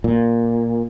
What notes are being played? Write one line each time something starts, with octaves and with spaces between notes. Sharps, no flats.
A#2